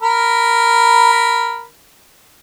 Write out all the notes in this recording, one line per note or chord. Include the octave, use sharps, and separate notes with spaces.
A#4 B5